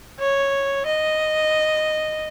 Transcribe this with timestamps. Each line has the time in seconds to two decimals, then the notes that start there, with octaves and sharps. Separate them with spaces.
0.19 C#5
0.86 D#5